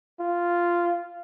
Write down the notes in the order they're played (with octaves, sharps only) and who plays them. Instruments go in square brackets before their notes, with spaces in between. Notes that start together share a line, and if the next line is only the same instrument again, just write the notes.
[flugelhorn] F4